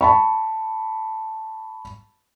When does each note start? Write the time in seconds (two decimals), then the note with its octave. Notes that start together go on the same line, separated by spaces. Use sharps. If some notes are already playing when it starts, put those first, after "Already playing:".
0.01 A5 B5 C#6